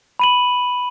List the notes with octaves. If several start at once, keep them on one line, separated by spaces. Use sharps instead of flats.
B5 D#7 F#7